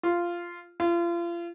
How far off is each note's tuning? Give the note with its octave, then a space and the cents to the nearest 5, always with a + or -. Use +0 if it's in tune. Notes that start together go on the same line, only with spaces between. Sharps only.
F4 -10
F4 -35